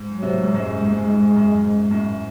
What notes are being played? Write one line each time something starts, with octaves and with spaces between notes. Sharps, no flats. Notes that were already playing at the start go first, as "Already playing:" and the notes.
Already playing: G#2
F#3
C3
A2
G#2
F#2 G#3
G#2
A2
G#2
G#2
F#2
F#2
G#2
F#2 A2